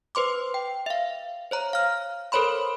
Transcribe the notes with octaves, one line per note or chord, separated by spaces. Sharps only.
B4 C5 C6 D6
G5
E5 F5
C5 C#5 A#5
F5 F6
A4 A#4 C5 C#5 B5 C6